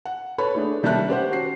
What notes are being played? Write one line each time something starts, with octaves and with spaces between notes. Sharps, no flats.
F#5
A4 B4 C#5 B5
A3 D4 G#4
D#3 G3 C#4 E5 A5 F#6
C#4 G4 C5 F#5
F#4 C7